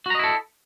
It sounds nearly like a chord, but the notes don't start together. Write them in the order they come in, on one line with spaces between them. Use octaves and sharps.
F#4 A#5 D#5 E4 A4